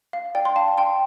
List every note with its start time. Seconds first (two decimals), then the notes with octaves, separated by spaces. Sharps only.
0.13 F5
0.35 D5 G5
0.45 C6
0.56 F5 A5
0.78 G5 C6